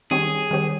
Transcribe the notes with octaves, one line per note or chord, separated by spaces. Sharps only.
D#3 G3 C4 G4 G#4 C#5
D#3 G3 C4 G4 C#5